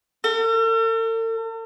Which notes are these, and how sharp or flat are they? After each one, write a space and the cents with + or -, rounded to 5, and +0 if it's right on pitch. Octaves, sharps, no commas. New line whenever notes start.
A4 +45